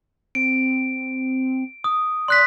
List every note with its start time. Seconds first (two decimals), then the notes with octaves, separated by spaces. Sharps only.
0.35 C4 D7
1.84 D#6
2.28 D5 C6 F#6 B6